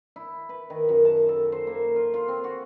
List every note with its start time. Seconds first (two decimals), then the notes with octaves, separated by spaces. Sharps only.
0.16 E4
0.49 B4
0.70 D#3
0.89 F#2
1.05 A5
1.29 A4
1.52 C5
1.67 A#3
1.96 F4
2.14 F4
2.28 C4
2.44 F#4